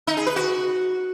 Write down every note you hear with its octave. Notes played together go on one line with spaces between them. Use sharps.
D#4
G#4
B4
F#4